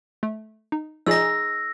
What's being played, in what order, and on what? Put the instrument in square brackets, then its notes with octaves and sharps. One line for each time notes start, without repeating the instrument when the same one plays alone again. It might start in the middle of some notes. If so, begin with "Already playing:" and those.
[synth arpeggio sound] A3
D#4
[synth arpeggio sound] F3 F4 D5 [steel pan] D#4 G#4 [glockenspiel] E6 A#6